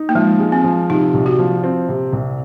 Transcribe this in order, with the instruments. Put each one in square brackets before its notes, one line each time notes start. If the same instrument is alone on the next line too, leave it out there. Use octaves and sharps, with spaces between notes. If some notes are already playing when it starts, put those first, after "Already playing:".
Already playing: [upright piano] D#4
[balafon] A#3
[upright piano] F3 [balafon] G#3
[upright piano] G#3
[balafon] C4
[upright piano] F3
[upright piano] C3 [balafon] D#4
[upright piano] C2
[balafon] F#4
[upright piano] F3
C4
C3
C2